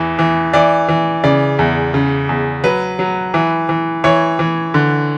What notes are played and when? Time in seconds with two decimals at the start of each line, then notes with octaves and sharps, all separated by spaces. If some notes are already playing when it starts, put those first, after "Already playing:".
Already playing: E2 E3
0.19 E3
0.53 E3 D5
0.89 E3
1.24 C#3 D5
1.59 E2
1.94 C#3
2.29 E2
2.64 F#3 B4
2.99 F#3
3.34 E3
3.69 E3
4.04 E3 C#5
4.39 E3
4.74 D3